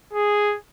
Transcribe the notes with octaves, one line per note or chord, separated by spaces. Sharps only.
G#4